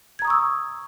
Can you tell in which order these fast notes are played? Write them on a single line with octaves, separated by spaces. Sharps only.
G#6 A#5 D#6 C#6 E6